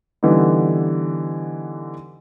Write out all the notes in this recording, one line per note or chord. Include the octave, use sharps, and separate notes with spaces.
D3 E3 G3 B3 D#4